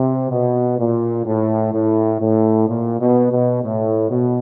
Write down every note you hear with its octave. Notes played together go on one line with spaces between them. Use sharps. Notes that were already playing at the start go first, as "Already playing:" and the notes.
Already playing: C3
B2
A#2
A2
A2
A2
A#2
B2
B2
A2
B2